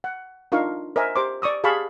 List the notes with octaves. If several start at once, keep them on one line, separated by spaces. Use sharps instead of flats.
F#5
D4 D#4 F4 A#4 F5 C#6
A#4 C5 D#5 E5 G#5
G4 C5 A#5 C6 D6
D5 C#6 D#6 E6
G4 G#4 F5 A5 B5 C#6